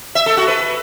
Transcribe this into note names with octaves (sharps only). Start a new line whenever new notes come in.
E5
A4
F#4
B4